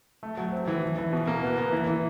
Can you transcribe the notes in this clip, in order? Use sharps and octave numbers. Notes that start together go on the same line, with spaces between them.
A3
F#3
C4
E3
E3
E3
B2
A#3
B3
B3
E3
E3